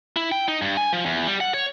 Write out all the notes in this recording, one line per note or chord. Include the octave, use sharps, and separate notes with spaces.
E4
G5
D#4
G2
G#5
F3
E2
G3
F#5
C#5